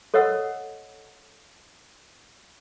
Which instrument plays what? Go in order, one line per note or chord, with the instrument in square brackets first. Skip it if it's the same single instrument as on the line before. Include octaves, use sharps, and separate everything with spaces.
[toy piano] A4 C#5 D#5 F#5 E6